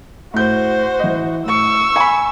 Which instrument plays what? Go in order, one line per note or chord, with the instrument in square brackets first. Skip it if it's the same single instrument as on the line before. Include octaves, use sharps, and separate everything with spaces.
[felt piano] A2 G6 [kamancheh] F#4 C5
[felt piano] E3 D#5
[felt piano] A2 [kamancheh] C#6 E6
[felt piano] G#5 B5